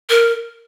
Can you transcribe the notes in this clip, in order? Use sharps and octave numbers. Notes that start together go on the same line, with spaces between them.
A#4